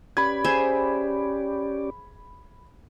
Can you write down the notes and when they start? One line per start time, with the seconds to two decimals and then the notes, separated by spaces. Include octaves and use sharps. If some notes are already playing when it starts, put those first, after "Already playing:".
0.17 C#4 G4 B4 D5 B5 G#6
0.45 G#4 C5 E5